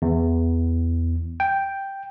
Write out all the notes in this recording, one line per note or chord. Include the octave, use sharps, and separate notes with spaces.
E2
G5